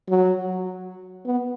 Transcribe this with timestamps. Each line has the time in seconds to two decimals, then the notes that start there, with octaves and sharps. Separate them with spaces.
0.09 F#3
1.26 B3